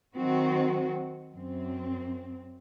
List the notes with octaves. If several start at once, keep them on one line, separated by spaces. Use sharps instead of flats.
D#3 F#3 C4 F#4
F#2 C4